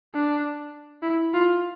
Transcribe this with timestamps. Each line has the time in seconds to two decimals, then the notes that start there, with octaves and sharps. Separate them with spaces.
0.14 D4
1.03 E4
1.34 F4